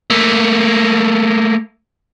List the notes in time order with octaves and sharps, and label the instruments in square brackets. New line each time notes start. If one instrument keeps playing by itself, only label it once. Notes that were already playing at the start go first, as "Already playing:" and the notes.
[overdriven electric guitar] A3 A#3